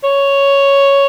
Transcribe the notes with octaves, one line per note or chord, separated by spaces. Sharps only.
C#5